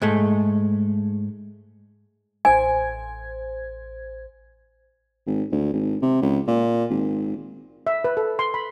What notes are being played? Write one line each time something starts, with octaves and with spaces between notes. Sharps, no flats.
G#2 G#3 A3
A1 C5 G#5 G#6
G#1
D2
G#1
C3
C#2
A#2
G#1
E5
B4
A4
C6
B5